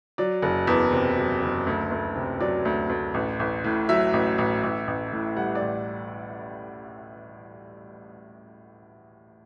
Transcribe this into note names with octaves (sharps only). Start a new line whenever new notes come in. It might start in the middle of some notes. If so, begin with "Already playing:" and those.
F#3 D5
F#1
E2
C3
F#3
F#1
D2
D2
C3
F#3 D5
D2
D2
A1
A1
A2
F#3 E5
A1
A1
A1
A1
A2
G3 F#5
D5
A1